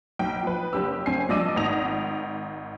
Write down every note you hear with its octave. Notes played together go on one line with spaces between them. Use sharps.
B1 G5
F3 B4
F#1 G4 E6
F#1 C4 G#5 C7
G2 F3 D5 D#5 E6 D#7
G#1 G#2 D#6 A#6 F7